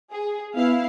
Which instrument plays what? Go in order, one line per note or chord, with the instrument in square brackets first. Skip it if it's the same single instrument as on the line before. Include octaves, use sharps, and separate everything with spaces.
[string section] G#4
[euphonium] B3 [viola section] E4 [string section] F5